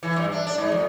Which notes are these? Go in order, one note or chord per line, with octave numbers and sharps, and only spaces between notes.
E3
G2
D4
D4
G#2
F2